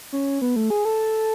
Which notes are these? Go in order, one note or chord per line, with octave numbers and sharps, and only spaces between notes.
C#4
B3
A3
G#4
A4